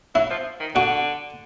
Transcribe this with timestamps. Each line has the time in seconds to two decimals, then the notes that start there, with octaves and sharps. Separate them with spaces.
0.15 F#3 E4
0.31 F3
0.60 D#3
0.75 D3 F#4